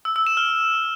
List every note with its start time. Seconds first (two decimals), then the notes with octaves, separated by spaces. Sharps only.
0.05 E6
0.16 E6
0.27 E7
0.37 F6